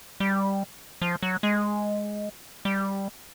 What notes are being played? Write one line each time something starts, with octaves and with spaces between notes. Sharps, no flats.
G3
F3
F#3
G#3
G3